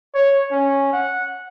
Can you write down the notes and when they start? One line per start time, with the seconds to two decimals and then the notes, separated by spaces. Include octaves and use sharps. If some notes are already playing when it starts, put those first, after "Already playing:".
0.15 C#5
0.52 C#4
0.93 F#5